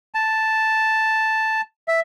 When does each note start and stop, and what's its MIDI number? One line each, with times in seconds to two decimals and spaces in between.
0.14 1.61 81
1.88 2.00 76